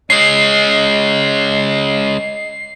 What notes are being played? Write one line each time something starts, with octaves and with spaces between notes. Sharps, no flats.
G#3 C#4 D#5 C7